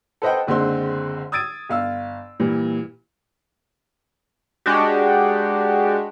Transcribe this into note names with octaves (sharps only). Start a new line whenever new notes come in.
A4 B4 C5 D#5 F#5 G5
F#1 D3 G#3 C4 C6
D#6 E6 G#6 A6 D7 D#7
G1 F5 E6
A#2 E3 G3
G#3 D4 F#4 G4